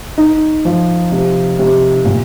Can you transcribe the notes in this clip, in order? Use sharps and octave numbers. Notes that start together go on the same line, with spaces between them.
D#4
F3
C3
C3
A#2